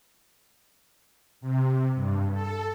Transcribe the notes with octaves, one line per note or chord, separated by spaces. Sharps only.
C3
G2
A4